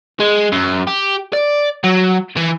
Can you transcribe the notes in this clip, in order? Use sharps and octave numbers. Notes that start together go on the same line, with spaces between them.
G#3
F#2
G4
D5
F#3
E3